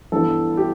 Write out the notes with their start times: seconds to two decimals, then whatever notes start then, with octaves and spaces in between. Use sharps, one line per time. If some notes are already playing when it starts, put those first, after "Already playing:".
0.12 G2 E3 G3 B3 A4
0.57 G4